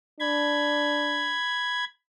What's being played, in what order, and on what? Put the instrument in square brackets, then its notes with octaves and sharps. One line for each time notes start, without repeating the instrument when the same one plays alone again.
[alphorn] D4 [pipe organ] B5 G#6